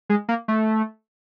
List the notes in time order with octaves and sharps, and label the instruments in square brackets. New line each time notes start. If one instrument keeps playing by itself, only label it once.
[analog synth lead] G#3
A#3
A3